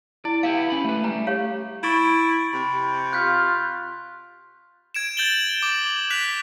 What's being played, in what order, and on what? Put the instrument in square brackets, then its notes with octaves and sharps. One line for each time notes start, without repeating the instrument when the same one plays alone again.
[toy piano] E4 [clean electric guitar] D5
[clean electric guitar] B3 E4 G4 [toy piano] F5
[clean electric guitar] C#4 B5
A3 B4
[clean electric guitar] G3 A3 [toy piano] A#5
[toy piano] G4 C#5 F5
[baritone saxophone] E4 [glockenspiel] C#6 A6 D7
[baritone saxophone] C3 [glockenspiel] B5
[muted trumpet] F4 [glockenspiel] F#6 G6 B6
[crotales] G#6 D7 E7
G6 A6 F#7 G7
D6
F#6 B6 F7